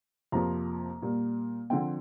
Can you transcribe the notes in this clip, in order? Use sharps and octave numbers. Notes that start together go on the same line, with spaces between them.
F2 C3 F3 A#3 A#5
A#2 G3 A#3
D3 F3 C4 G5